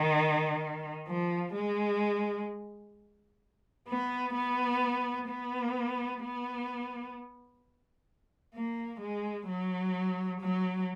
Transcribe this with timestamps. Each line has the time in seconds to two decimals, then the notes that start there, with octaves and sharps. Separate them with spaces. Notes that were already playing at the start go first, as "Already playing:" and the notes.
Already playing: D#3
1.08 F3
1.54 G#3
3.88 B3
4.34 B3
5.28 B3
6.22 B3
8.55 A#3
9.00 G#3
9.48 F#3
10.41 F#3